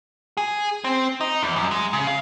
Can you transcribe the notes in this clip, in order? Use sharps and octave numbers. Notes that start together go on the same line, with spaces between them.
G#4
C4
D#4
E2
F#2
G#3
C#3
F5